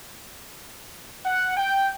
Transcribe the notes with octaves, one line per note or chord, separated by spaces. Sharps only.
F#5
G5